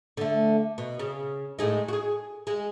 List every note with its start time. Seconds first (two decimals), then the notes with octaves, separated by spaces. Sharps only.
0.17 D3 A3
0.78 B2
0.99 C#3
1.59 A2 G#3 D#4
1.88 F#4 G#4
2.47 G#3